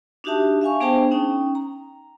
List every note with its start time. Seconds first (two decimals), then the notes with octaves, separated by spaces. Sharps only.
0.24 D4 D#4 F#4 G4 E5 A5
0.61 E5 F5 G#5 C#6
0.80 B3 D4 G#4 C5 G5 A5
1.11 C#4 D#4 G5
1.55 A#5